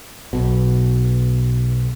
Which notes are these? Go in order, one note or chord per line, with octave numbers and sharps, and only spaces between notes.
B1 B2